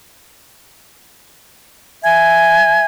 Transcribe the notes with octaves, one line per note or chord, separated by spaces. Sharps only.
E5 G#5 G#6